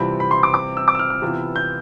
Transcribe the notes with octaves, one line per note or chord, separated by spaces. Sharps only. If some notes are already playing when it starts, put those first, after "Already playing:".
Already playing: C3 E3 G3 C4 F4 B5
B5
C6
D6
D6
E6
D6
E6
F6
F6
C3 E3 B3 F4
G6